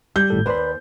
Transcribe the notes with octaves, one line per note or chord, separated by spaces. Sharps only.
G3 G6
G#1 A2 A4
D#2 B4 C5 D5 B5